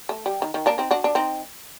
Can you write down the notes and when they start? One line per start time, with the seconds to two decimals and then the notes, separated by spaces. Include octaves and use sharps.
0.09 A3
0.26 G3
0.42 D#3
0.54 D#3
0.66 A#3 D4
0.78 C4 D#4
0.91 D4 F#4
1.04 D4
1.15 C4 D#4